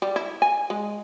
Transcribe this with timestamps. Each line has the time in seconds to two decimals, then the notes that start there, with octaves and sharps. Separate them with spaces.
0.02 G3
0.16 E4
0.42 G#5
0.70 G#3